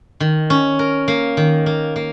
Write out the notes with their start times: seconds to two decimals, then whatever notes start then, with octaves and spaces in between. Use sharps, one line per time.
0.20 D#3
0.50 C#4
0.79 A#4
1.08 A#3
1.37 D#3
1.66 A#3
1.96 A#3